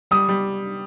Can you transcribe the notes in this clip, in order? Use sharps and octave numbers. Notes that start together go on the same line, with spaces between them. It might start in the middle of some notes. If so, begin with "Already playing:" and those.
G3 D#6
G3